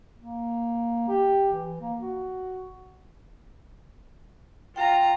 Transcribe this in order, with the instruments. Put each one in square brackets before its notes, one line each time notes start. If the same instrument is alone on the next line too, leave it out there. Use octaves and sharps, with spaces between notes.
[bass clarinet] A#3
G4
E3
A#3
F#4
[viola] F4 A#5 [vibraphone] G5